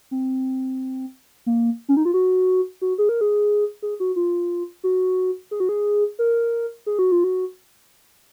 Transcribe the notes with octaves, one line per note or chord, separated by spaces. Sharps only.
C4
A#3
C#4
D#4
F4
F#4
F#4
G#4
A#4
G#4
G#4
F#4
F4
F#4
G#4
F#4
G#4
A#4
G#4
F#4
F4
F#4